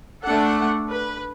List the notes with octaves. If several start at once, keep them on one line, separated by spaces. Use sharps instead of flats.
A3 D4 A4 F#5
B4